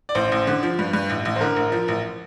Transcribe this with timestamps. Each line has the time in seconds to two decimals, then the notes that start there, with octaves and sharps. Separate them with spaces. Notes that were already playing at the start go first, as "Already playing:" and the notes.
0.09 D5
0.15 A1 C5
0.32 A1
0.47 D3
0.63 F3
0.79 G2
0.93 G2
1.10 A1
1.25 A1
1.36 C5
1.41 D3 A#4
1.56 A1
1.72 F3
1.88 A1